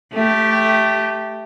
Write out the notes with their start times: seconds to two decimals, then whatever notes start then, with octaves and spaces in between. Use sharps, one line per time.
0.13 A3 G4